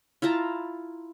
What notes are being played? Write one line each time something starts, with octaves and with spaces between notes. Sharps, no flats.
E4 F4 A5 A#5